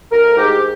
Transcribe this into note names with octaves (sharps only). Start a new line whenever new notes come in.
D2 A#4
G#2 G4